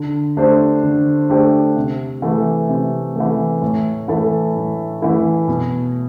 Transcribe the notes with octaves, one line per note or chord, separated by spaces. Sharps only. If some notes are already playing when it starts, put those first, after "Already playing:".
Already playing: D3
A3 D4 G4 C5
D3
A3 D4 G4 C5
C3
E3 A3
C3
E3 A3
A2
E3 A3 E4 A4
A2
E3 A3 E4 A4
B2